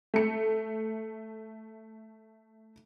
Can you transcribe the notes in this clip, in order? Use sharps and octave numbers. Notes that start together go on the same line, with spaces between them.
A3 C#7